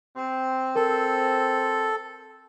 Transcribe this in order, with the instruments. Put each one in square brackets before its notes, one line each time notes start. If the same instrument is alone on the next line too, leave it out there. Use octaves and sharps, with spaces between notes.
[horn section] C4
[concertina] A4 [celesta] A#4